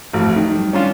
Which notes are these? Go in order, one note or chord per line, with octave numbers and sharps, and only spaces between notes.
A1 F2 A3 F#4
D#3
F#3 G3
C#4 D4 F4